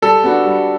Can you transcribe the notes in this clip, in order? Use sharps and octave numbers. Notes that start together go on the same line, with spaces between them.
G3 A4
B3 D4 F#4
G3